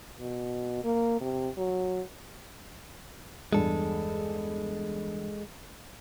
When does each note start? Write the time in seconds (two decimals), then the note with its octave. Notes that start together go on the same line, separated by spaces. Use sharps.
0.20 B2
0.84 A#3
1.20 C3
1.57 F#3
3.53 E2 G2 G#3 A4